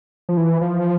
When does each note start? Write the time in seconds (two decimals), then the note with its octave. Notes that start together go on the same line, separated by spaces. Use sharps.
0.29 F3
0.37 E3
0.61 F3